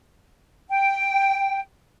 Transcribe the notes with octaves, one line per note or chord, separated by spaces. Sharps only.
G5